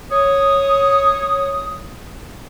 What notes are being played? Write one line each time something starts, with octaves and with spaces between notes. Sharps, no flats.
C#5 D#6